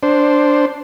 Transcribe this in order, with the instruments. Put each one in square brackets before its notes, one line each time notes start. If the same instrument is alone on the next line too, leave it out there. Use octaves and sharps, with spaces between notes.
[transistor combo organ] D4 C5